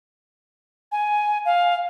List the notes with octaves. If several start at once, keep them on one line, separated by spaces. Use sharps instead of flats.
G#5
F5